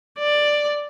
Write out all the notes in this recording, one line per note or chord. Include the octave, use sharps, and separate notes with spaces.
D5